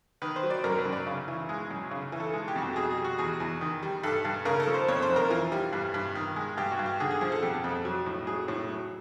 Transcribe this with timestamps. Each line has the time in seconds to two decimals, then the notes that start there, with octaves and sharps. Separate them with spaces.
0.22 D#3 B4
0.36 C5
0.43 F#3
0.50 D5
0.64 F#2 A#4
0.79 B4
0.85 F#2
0.92 D5
1.07 C#3
1.28 E3
1.49 G#3
1.70 F#2
1.91 C#3
2.12 E3
2.20 A4
2.33 G#3
2.48 G4
2.55 F2 F#4
2.62 G4
2.76 B2 G#4
2.90 G#4
2.97 G3
3.04 F#4
3.18 E2 G#4
3.40 E2
3.61 D#3
3.83 G3
4.03 G2 A4
4.25 G2
4.45 C#3 A#4
4.60 A4
4.67 F3
4.74 C5
4.88 F2 C#5
5.02 C5
5.09 F2
5.16 A#4
5.30 E3 F4
5.52 G3
5.73 G2
5.94 G2
6.15 D#3
6.36 G#3
6.57 G2 G4
6.71 F#4
6.79 G2
6.86 G4
7.00 D3 G#4
7.11 G#4
7.21 F3 G#4
7.32 A4
7.42 F2 G4
7.64 F2
7.85 F#3
8.06 A2
8.27 F#3 G#4
8.48 A2
8.69 F#3